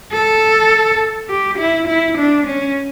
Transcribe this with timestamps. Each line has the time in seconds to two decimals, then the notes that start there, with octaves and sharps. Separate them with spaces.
0.13 A4
1.30 G4
1.59 E4
1.87 E4
2.18 D4
2.46 C#4